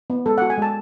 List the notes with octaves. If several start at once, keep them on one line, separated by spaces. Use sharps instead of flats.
B3
G#3 A4
F#5
F#4
G#5
G#3 A5